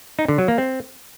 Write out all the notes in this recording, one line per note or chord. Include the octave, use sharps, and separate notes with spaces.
D#4
D3
F#3
A#3
C4